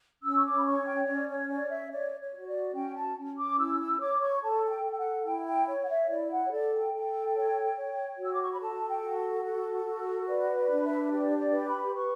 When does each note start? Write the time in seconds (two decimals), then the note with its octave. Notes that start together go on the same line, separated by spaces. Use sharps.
0.24 C#4 E6
0.37 C#6
0.45 D6
0.57 B5
0.65 C#5 C#6
0.86 G5
1.07 C#4 D5
1.29 C#5
1.49 C#5 D5
1.70 E5
1.91 C#5 D5
2.20 C#5
2.34 F#4
2.47 D5
2.74 C#4 G5
2.96 A5
3.17 C#4
3.38 D6
3.58 E4 E6
3.80 E6
4.00 C#5 D6
4.21 C#6
4.42 A4 A5
4.66 A5
4.70 G5
4.83 A4
4.92 G5
4.99 F#5
5.25 E4 G5
5.47 G5
5.67 C#5
5.85 F#5
5.89 E5
6.09 E4 D5
6.30 F#5
6.47 C#5
6.51 A4 D5
6.73 G5
6.94 A4
7.35 C#5
7.77 C#5
8.19 F#4 E6
8.32 D6
8.42 C#6
8.52 B5
8.61 A4 A5
8.89 G5
9.02 F#4
9.44 A4
9.86 F#4
10.28 B4 D5
10.56 D5
10.70 D4
10.84 E5
11.12 G4 D5
11.39 D5
11.53 B4
11.68 B5
11.95 B4 C#6